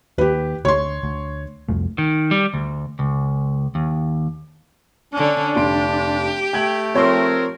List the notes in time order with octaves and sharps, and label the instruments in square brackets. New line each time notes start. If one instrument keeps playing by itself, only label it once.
[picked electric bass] D#2 [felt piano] G4 B4
[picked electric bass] D2 [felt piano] C#5 C6
[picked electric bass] D2
C2 F2 A3
[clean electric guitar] D#3
G3
D2
C#2
D#2
[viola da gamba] D3 C#4 [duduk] D4
[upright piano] F1 C6 D7 [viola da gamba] G4
[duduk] A3 [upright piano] G5 G#6 F#7
[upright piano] F3 C#5 C6 [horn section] C4 A#4